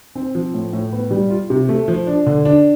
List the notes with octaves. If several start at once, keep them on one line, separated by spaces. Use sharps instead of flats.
C4
F3
A2
A2
B3
G3
F4
C3
A3
F3
D4
D3
D4